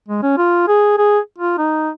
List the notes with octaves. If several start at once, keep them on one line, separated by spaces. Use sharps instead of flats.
G#3
C#4
F4
G#4
G#4
F4
D#4